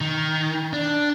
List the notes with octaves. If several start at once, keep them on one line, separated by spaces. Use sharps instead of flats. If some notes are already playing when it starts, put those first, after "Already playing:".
D#3
D4